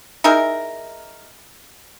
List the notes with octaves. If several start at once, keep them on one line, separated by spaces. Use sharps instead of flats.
D#4 E4 G#4 A#4